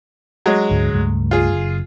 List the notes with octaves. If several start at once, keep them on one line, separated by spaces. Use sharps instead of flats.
F#3 G#3
D2 G#2 D3
C#2 G2 A3
F4 G#4
F#1